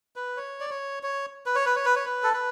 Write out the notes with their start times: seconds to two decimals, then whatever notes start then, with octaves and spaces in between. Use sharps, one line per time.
0.16 B4
0.37 C#5
0.60 D5
0.70 C#5
1.03 C#5
1.46 B4
1.55 C#5
1.66 B4
1.76 C#5
1.85 B4
1.96 C#5
2.05 B4
2.23 A4
2.33 B4